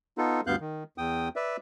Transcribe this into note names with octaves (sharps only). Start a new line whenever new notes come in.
B3 D#4 F4 A4
D2 G2 B3 F5 F#6 G6
D#3
E2 G5 D#6
B4 D5 E5